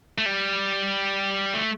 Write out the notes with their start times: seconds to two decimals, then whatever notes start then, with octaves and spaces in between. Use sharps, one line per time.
0.18 A3
0.26 G3
1.54 A3